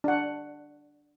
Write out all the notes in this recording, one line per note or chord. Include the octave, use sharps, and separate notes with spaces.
D4 F#5